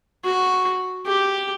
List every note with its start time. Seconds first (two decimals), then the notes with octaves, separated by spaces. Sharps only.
0.25 F#4
1.06 G4